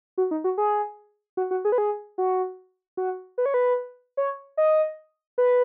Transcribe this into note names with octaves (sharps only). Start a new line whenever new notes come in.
F#4
D#4
F#4
G#4
F#4
F#4
G#4
B4
G#4
F#4
F#4
B4
C#5
B4
C#5
D#5
B4